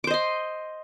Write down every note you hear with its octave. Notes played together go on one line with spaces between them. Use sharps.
C5 D#5 C6 D6